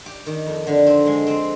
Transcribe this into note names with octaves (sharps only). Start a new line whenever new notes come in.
G4
D#3
F2
D3
C4
G#3
C4